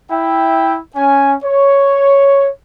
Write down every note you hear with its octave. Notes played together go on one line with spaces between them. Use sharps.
E4 E5 G5
C#4 G#5
C#5